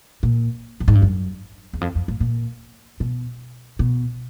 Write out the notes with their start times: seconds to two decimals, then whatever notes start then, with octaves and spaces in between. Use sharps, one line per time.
0.23 A#2
0.80 A2
0.88 G#2
0.95 G2
1.02 F#2
1.73 E2
1.81 F2
1.95 F2
2.08 A2
2.20 A#2
3.00 B2
3.79 B2